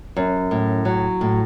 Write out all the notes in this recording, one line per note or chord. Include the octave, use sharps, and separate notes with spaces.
F#2
A2
F#3
A2